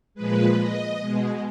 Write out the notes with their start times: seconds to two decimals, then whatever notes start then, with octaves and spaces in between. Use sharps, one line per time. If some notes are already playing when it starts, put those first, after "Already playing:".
0.14 A#2 F3 G#3 B4
0.58 D#5
1.01 B2 G#3